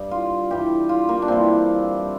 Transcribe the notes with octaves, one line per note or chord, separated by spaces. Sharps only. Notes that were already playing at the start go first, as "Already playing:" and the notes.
Already playing: G2
F4
G2 E3 G4
F4
A#3
D4
G2 E3 C4